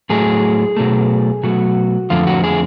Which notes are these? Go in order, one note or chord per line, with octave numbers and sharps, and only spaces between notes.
A2 F#3 A3 G#4
B2 F#3 A3
B2 F#3 A3 F#4
F2 D3 F3 A3 F4
F#4
G#4